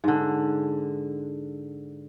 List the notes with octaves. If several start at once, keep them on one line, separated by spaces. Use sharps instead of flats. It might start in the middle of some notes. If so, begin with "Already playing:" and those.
G#2 D3